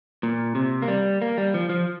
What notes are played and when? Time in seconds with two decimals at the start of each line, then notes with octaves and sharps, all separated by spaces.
0.23 A#2
0.55 C3
0.82 A#3
0.88 G3
1.22 A#3
1.38 G3
1.54 F3
1.69 F3